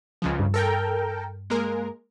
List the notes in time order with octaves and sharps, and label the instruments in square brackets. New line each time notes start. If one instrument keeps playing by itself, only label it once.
[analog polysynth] C#2 C#3 F3
[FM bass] G2
[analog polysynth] A4 A#4 G5
G#3 A#3 A#4